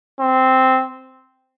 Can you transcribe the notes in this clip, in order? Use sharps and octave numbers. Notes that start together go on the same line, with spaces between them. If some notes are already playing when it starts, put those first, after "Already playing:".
C4